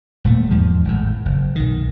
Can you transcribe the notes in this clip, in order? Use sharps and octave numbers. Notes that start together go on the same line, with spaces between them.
D#1 A#2 A3
E2 G#2 F3 G#3
G#1 A2
F#1
B1 D#3